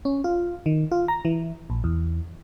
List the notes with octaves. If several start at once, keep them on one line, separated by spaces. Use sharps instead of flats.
C#4
F4
D#3
F4
A#5
E3
A#1
E2